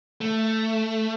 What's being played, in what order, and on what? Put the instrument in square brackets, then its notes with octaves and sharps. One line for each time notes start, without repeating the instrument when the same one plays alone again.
[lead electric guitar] A3